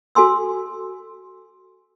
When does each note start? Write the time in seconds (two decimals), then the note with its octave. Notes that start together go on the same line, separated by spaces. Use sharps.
0.15 F#4 A4 G#5 C6 E6